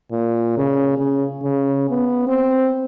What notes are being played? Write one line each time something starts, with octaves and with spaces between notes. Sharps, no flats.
A#2
C#3
C#3
C#3
B3
C4